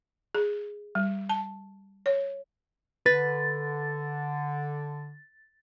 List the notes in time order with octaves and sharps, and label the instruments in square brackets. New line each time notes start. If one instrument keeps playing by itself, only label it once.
[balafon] G#4
G3
A5
C#5
[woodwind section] D3 [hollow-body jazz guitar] B4 [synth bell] A6